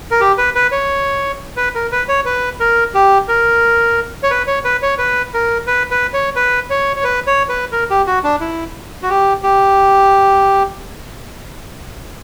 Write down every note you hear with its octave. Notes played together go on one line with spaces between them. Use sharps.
A#4
G4
B4
B4
C#5
B4
A#4
B4
C#5
B4
A#4
G4
A#4
C#5
B4
C#5
B4
C#5
B4
A#4
B4
B4
C#5
B4
C#5
C#5
B4
C#5
B4
A#4
G4
F#4
D4
E4
F#4
G4
G4